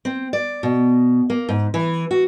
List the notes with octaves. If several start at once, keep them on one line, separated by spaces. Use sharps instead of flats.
C4
D5
B2
A#3
G#2
E3
F#4